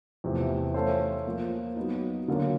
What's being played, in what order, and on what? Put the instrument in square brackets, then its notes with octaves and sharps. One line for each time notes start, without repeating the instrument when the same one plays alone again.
[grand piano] E2 C3 F3 A3
A3 C#4 F4 A4 C5
F3 A#3 C#4
F#3 B3 D#4
D3 F#3 A#3 C#4 F4